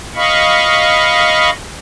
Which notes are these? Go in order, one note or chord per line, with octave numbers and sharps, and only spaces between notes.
D#5 F5 B5 C#6